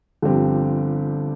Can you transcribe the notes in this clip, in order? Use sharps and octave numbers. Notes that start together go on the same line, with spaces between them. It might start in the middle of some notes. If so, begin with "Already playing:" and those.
G1 G2 F3 C4 G4